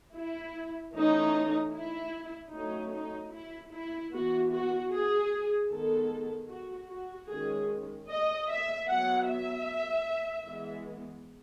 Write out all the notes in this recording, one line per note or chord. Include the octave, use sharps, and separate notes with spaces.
E4
E3 A3 C#4 D#4
E4
F#3 A3 C#4 D#4
D#4
E4
E4
E3 B3 F#4
F#4
G#4
D#3 G#3 B3 A4
F#4
F#4
D#3 G#3 C#4 G#4
D#5
E5
F#3 B3 F#5
E5
E3 G#3 B3